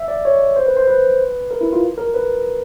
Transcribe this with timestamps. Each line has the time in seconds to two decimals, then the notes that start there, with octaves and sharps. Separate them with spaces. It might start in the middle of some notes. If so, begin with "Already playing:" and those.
Already playing: E5
0.08 D5
0.25 C#5
0.56 C5
0.66 B4
0.77 C5
0.87 B4
1.51 A#4
1.61 E4
1.73 F4
1.98 A#4
2.14 B4